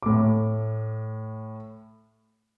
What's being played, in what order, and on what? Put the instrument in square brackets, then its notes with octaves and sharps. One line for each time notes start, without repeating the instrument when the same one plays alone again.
[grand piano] A2 D6